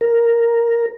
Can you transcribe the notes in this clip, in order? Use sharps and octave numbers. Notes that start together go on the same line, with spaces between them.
A#4